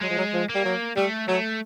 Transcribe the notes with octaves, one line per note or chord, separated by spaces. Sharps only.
F#3 G#3
F3
F#3
F3
A#3
G3
F#3
G3 A3
F#3 A3